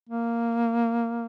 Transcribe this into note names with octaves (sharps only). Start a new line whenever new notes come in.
A#3